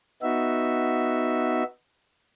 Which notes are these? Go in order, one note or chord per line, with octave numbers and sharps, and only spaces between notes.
B3 D#4 F#4 E5